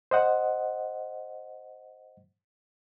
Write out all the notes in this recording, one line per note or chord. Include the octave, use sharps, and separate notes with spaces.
C5 D#5 F#5